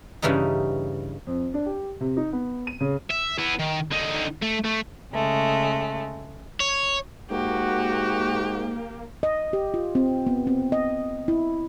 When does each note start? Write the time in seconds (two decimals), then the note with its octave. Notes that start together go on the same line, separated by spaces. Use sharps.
0.22 G2 C#3 E3 G3 D#4
1.27 F2
1.54 D4
1.66 G4
2.00 C3
2.17 D#4
2.33 B3
2.67 D#7
2.80 C#3
3.10 E5
3.38 B3 E4
3.59 D#3
3.91 D3 D#4
4.42 A3
4.64 A3
5.14 C#3 G#3 A3
6.60 C#5
7.31 G#2 A#3 F#4 G4
9.23 D#5
9.53 G4
9.74 F4
9.95 C4
10.27 B3
10.47 C4
10.72 D#5
11.28 E4